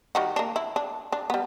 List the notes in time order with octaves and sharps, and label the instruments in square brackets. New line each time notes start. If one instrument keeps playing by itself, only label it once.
[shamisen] D#3 G3 F#4
A#3 D4
E4
D4
D4
G3 B3